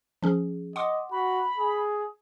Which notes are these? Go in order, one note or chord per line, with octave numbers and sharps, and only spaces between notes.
F3 C#4 G#4
D#5 F#5 C6 D6
F#4 B5
G#4